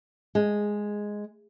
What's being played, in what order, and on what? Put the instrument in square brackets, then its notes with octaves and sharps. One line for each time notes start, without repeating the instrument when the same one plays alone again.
[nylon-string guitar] G#3